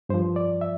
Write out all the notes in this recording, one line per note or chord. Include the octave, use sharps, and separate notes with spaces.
G2 F3 C5
D5
E5